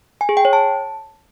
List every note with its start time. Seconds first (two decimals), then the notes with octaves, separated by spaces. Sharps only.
0.21 G#5
0.29 G#4
0.37 G5
0.45 C#5
0.53 A5